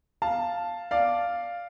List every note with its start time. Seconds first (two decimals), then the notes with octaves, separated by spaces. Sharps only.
0.22 F5 A5
0.91 D5 F5